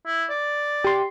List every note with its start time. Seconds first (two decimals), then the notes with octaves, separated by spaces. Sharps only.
0.06 E4
0.30 D5
0.84 G4 C6